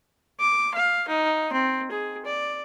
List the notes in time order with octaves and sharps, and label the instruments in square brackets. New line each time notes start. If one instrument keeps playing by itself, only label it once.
[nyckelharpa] D6
F5
D#4
C4
G#4
D5